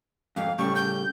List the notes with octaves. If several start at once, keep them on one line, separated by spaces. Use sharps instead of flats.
F2 G#2 F5
A2 C#3 G3 C#6
G6